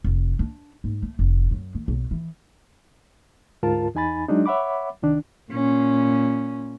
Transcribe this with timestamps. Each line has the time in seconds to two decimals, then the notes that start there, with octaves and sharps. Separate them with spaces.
0.04 F1
0.39 D4
0.84 G#2
1.02 A3
1.19 F1
1.51 F#2
1.75 D#3
1.88 B1
2.11 E3
3.63 D2 G#2 F4 A#4 A5
3.95 E2 D#4 G#5 B5 A6
4.28 F#3 G#3 D4 D#4
4.46 C#5 E5 F#5 B5 D6
5.02 C2 D#3 D4
5.51 A#2 C#4